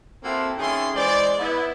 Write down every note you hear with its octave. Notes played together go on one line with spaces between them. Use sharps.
A#3 C4 E4 F#4 A4
D#3 C#4 E4 G#4 A4 C6
E3 G#3 C5 D5
B3 E4